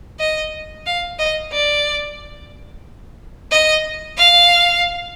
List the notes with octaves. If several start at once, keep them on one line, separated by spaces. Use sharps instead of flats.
D#5
F5
D#5
D5
D#5
F5